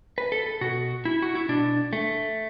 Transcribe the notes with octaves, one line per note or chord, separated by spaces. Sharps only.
B4
A4
A4
B2 F#4
E4
F#4
E4
B2 D4
A3